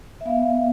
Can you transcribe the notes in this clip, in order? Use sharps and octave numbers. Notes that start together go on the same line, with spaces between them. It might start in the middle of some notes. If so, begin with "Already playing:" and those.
E5
B3 F5
B3